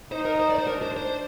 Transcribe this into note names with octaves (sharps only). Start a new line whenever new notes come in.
D#4 C5
A#4
C5
D5
C5
D4 A#4
C5
C5